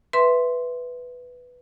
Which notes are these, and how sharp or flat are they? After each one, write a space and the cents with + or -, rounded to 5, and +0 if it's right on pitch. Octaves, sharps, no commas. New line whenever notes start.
B4 +0 E5 +0 C6 +0